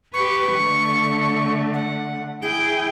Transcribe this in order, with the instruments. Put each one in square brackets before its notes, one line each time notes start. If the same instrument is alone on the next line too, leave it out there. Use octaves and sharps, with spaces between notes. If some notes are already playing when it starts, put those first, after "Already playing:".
[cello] G4 B4 [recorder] C#6
[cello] D3 A3
[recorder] F#5
[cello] E4 G5 [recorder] G#4